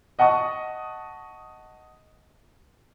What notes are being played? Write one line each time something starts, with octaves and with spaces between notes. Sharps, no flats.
D#5 F#5 A5 C#6 D#6